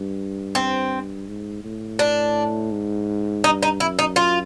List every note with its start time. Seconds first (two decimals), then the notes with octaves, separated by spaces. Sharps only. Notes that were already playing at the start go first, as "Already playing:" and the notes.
Already playing: G2
0.55 C4
1.28 G#2
1.64 A2
1.99 D4
2.71 G#2
3.44 G2 D#4
3.63 D#4
3.80 F#2 E4
3.99 D#4
4.16 F4